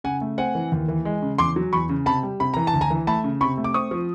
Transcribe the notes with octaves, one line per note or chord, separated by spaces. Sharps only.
C#3 F#5 G#5
A3
C4 F#5 G#5
E3
D#2
E3
G#3
C#3
E2 C6 D6
F#3
E2 B5 C#6
C#3
C3 A5 B5
G3
C3 B5
E3 A#5
A5
D2
G#5 A#5
E3
A3 A5 B5
C#3
C3 B5 C#6
A3
D6
C4 C#6 D#6
F3